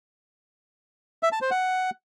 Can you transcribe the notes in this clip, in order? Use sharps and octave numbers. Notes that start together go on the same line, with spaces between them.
E5
A5
C5
F#5